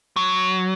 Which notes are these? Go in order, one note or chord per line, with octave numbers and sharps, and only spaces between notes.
F#3